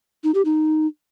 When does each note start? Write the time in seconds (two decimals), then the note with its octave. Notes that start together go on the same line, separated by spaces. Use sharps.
0.24 D#4
0.34 G4
0.45 D#4